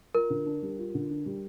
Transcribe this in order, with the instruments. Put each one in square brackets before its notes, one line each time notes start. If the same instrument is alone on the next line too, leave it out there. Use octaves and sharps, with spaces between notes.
[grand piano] F4 [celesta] A#4
[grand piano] D3
D4
G3
F4
D3
D4
G3